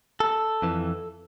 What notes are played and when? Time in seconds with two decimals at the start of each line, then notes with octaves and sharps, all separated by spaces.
0.20 A4
0.62 F2 E3